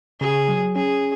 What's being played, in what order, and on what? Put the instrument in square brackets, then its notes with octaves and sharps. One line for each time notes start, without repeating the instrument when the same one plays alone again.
[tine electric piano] C#3 [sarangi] G#4
[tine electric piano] F#3
[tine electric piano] C#4 [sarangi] G#4